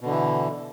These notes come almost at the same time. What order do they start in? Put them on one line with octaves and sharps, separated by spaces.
B2 D3 E3